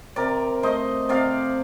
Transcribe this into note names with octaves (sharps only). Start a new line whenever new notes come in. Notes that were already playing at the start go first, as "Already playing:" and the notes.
C3 A#4 D5
A3 C5 D#5
C3 D5 F5